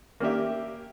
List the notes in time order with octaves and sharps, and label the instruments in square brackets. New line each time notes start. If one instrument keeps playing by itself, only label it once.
[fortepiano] A#3 C#4 G4 E5